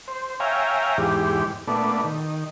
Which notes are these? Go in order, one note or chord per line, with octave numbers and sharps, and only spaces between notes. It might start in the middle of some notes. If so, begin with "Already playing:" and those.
C5
C#5 E5 F5 G5 G#5 A#5
E2 G#2 G4
A#2 A3 B3 D4
D#3